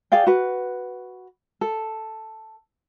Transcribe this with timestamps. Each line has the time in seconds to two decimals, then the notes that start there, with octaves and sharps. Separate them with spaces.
0.12 G#4 D5 F5 G5
0.27 F#4 B4
1.61 A4